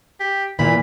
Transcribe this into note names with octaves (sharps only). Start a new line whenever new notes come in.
G4
A#2 E3 A#3 B5